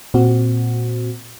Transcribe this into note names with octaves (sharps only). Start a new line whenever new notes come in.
A#2 C4 F#4